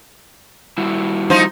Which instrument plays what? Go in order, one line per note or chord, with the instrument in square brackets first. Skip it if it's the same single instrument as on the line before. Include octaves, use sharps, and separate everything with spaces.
[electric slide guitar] G3 E4 F#4
[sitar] F3 D#4 C5